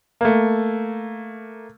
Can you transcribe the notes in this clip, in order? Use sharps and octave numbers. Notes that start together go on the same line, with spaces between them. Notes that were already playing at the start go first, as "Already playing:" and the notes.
A3 A#3